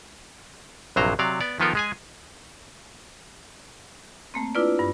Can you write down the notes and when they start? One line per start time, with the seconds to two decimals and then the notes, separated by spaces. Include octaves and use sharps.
0.96 A#1 G2 C3 F#3 C5 A#5
1.19 C3 F#3 D5 F5
1.41 B3 D5
1.60 D#3 F3 B3 F4 A4 A#4
1.75 G#3 G#4 G#5
4.34 A3 A#3 C4
4.55 D4 E4 F4 B4 D5
4.79 G2